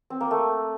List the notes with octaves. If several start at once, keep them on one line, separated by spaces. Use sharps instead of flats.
C4
A#3
A3